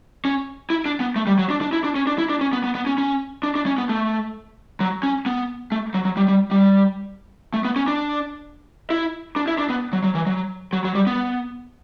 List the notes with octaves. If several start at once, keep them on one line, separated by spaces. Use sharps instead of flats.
C#4
E4
D4
B3
A3
G3
F#3
D4
D4
E4
D4
C#4
D4
E4
D4
C#4
B3
B3
B3
C#4
C#4
D4
D4
C#4
B3
A3
F#3
C#4
B3
A3
F#3
F#3
G3
G3
G3
A3
B3
C#4
D4
E4
D4
E4
D4
B3
F#3
F#3
E3
F#3
F#3
F#3
G3
B3